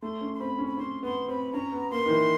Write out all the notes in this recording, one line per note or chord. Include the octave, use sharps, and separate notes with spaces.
A3 C6
C#4
C6
C4 B5
C#4
B5
C#4 C6
B3 C6
C4 B5
C#4 A#5
B3
A#3 C6
D#3
E3